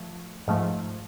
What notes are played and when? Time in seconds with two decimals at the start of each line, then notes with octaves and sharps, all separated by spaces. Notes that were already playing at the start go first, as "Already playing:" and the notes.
Already playing: F3 A3
0.48 G#2 F3 A3